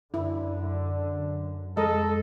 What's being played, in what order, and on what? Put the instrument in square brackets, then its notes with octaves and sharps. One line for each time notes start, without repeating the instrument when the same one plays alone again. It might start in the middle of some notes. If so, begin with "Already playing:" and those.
[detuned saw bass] F#2 [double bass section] D3 [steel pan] E4
[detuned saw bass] F2 [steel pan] G#3 A#4 D#5 [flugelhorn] A4